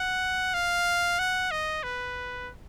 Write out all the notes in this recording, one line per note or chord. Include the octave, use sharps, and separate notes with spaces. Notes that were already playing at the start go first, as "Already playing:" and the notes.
Already playing: F#5
F5
F#5
D#5
B4